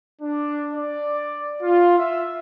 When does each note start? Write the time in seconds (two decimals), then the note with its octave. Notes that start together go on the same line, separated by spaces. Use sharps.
0.22 D4
0.74 D5
1.62 F4
1.98 E5